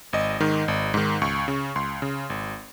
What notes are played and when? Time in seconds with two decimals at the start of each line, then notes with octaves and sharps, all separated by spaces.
0.13 G#1 D#5
0.40 G#2 D#3
0.68 G#1
0.94 G#2 D#3
1.22 C#2 C#6
1.48 C#3
1.76 C#2 C6
2.02 C#3
2.30 G#1